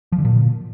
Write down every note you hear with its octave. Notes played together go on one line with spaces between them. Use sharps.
F3
D3
A#2